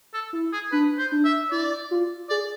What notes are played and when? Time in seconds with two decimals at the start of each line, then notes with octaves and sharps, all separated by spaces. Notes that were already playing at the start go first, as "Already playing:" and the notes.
0.14 A4
0.33 E4
0.53 G#4
0.72 D4 B4
0.98 C5
1.12 D4
1.25 E5
1.51 E4 D5
1.91 F4
2.30 G#4 D5